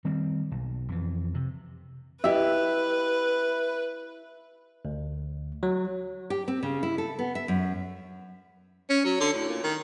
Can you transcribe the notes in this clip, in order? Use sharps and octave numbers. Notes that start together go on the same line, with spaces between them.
D#3 G3 C4
B1
F2 E3
C3
E4 G4 B4 E5
D2
F#3
G4
C4
C#3
E4
A4
B3
E5
F#2
C#4
F#3
D3
A2
A#2
D#3